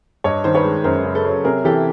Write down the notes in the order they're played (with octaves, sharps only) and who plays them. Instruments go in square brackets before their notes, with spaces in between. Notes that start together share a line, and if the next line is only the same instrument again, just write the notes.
[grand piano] G2 [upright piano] C#5 D#5
[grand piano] D#3 [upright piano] C5
[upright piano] B4 C#5
[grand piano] G#3
[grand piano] F#2 [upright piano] A#4 C5
[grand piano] C#3
[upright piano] A4 B4
[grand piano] F#3
[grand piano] C3 [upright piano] G#4 A#4
[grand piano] E3 [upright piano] G4 A4